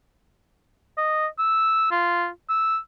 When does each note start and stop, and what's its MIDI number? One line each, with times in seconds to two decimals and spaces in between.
0.97 1.26 75
1.39 1.89 88
1.91 2.28 65
2.49 2.78 88